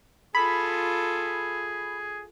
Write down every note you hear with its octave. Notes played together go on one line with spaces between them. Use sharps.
F4 G#4 A4 B5